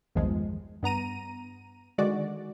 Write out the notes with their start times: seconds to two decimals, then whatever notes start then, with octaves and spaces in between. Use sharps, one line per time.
0.15 A#1 E2 G2 D#3 F3 G#3
0.83 G2 B3 A#5 D#7
1.98 D3 D#3 G#3 F#4 D5